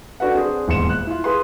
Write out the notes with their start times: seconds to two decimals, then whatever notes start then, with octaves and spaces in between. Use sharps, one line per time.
0.20 D4 F#4 A4 B4 F#5
0.35 C4 D4 G#4 C5
0.68 D#1 E2 G#2 C6 C#7 E7
0.90 F#6
1.07 E4 F4
1.24 G#4 B4 C6